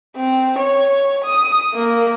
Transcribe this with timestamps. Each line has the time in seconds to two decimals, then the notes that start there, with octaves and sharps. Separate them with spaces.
0.16 C4
0.59 C#5
1.25 D#6
1.74 A#3